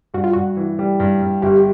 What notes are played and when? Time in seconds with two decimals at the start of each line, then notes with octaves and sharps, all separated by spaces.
0.14 G2 F#4
0.24 F4
0.33 G2 F#4
0.57 E3
0.79 G3
1.00 G2
1.22 G2
1.42 G1 G4